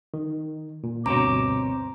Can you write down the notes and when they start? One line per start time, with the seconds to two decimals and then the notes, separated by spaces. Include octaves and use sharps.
0.14 D#3
0.84 A#2
1.06 D2 G2 B2 C4 C5 C#5 A#5 D6